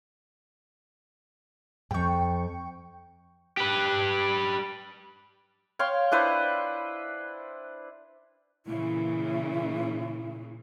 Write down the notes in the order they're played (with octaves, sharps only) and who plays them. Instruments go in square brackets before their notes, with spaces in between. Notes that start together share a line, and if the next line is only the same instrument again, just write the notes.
[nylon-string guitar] F2 G#2 [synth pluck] G5 C#6
[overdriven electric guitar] G4 B4
[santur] C#5 F5 G5 C6
D4 E4 B4 C5
[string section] A#2 C#3 E3 [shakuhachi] E4